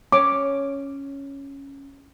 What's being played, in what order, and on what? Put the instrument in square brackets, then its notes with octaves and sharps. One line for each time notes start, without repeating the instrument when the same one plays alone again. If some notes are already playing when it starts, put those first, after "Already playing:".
[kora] C#4 [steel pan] D6